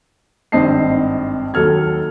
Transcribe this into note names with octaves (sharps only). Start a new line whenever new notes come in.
G#1 G2 C4 D#5 A5 C7
D#2 F#3 A4 F6 G#6